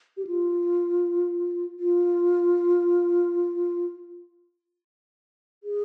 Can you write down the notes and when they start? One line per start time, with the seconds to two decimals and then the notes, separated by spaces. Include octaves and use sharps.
0.17 G4
0.27 F4
1.79 F4
5.63 G#4